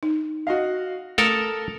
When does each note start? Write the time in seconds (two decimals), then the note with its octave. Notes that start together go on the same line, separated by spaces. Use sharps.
0.03 D#4
0.47 F#4 D#5 F5
1.18 A3 A4 A#4 A5 D#6 C#7